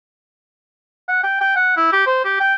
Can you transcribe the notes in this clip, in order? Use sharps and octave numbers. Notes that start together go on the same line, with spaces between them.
F#5
G5
G5
F#5
E4
G4
C5
G4
G5